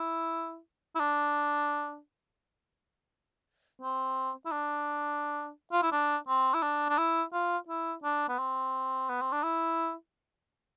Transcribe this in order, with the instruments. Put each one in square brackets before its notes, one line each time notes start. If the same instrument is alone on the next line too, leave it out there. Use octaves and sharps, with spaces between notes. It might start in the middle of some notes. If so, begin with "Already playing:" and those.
Already playing: [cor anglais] E4
E4
D4
C4
E4
D4
F4
E4
D4
C4
E4
D4
D4
E4
F4
E4
D4
B3
C4
B3
C4
D4
E4